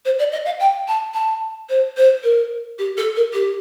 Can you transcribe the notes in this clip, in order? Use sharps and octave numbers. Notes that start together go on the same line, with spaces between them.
C5
D5
D#5
F5
G5
A5
A5
C5
C5
A#4
G4
A4
A#4
G4